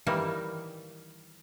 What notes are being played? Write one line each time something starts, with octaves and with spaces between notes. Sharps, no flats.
D#3 E3 G3 A#3 D#4